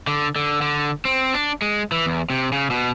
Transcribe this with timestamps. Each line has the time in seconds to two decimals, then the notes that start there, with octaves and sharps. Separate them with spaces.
0.07 D3
0.36 D3
0.62 D3
1.05 C4
1.34 D4
1.62 G#3
1.92 E3
2.06 E2
2.30 C3
2.52 C#3
2.70 B2